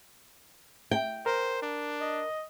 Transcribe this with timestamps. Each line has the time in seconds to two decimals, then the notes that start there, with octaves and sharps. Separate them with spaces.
0.91 G5
1.26 A#4 C5
1.62 D4
2.01 D#5